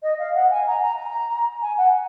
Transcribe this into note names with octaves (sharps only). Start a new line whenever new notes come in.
D#5
F5
F#5
G#5
A#5
A#5
A#5
G#5
F#5